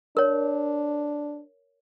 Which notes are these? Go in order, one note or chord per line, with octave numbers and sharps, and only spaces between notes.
D4 A#4 C#5